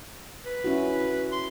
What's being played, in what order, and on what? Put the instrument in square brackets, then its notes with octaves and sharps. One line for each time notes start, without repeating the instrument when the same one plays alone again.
[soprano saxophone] B4
[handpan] C#4 E4 F#4
[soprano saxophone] C6